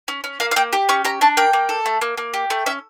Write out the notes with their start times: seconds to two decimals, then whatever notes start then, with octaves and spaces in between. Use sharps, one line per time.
0.08 C#4
0.24 C#4
0.40 A#3 F5
0.51 F5
0.56 A#3 G5
0.73 G4
0.89 C#4 C#6
1.05 G4 A#5
1.21 D4 A5
1.37 A#3 G5
1.53 A#3
1.69 A4
1.86 A3
2.01 A#3
2.18 A#3
2.34 G4
2.50 A3
2.66 C#4 E5